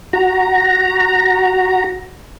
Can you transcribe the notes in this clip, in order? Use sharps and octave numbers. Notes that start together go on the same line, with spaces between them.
F#4 A#5